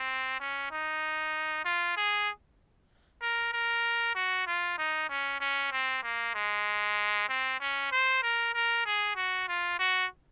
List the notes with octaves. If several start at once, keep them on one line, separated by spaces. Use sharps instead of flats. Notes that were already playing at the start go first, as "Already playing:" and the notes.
Already playing: C4
C#4
D#4
F4
G#4
A#4
A#4
F#4
F4
D#4
C#4
C#4
C4
A#3
G#3
C4
C#4
C5
A#4
A#4
G#4
F#4
F4
F#4